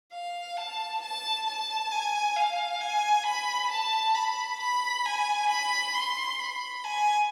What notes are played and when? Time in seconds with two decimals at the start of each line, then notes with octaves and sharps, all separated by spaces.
0.13 F5
0.57 A5
1.02 A5
1.47 A5
1.91 G#5
2.36 F5
2.81 G#5
3.26 B5
3.71 A5
4.15 B5
4.60 B5
5.05 G#5
5.49 B5
5.94 C6
6.39 B5
6.84 G#5